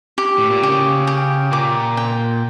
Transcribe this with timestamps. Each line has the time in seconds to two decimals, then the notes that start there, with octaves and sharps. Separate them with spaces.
0.18 G4
0.38 A2
0.50 A#2
0.63 C#3 G4
1.07 G4
1.52 A#2 D6
1.97 G5